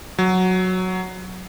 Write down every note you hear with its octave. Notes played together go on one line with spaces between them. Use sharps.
F#3